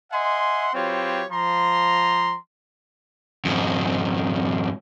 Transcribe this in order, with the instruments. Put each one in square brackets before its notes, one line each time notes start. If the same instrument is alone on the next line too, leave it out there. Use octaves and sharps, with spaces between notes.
[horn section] D#5 E5 F#5 G#5 C6
F#3 C4 F4 G4 B4 C#5
F3 A#5 C6
[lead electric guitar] F2 G#2